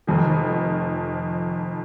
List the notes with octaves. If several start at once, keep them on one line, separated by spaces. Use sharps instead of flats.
F1 F2 D#3